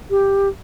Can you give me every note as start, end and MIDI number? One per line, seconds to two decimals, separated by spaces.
0.10 0.48 67